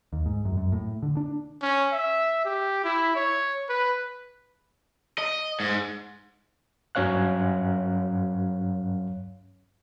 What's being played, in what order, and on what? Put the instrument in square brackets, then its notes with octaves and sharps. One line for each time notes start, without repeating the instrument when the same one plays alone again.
[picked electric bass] D#2
G#2
F#2
F#2
A2
D3
D4
[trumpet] C#4
E5
G4
E4
C#5
B4
[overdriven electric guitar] D#5
G#2
[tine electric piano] G2 F#3 C#4 C#5 F5 F#6